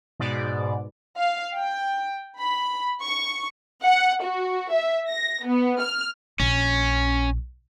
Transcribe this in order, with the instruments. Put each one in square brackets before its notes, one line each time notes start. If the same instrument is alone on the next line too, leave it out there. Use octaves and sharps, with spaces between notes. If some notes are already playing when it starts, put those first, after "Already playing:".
[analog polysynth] G#2 B2 D5
[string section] F5
G5
B5
C#6
[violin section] F#5
F#4
E5
A#6
B3
F6
[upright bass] A#1 [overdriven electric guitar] C#4